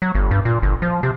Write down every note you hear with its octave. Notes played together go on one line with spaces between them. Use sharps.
F#3
G1
G2
A#2
G1
F3
C3